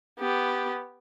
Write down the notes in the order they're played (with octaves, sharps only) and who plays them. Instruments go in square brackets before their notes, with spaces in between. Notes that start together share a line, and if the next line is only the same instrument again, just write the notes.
[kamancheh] B3 G4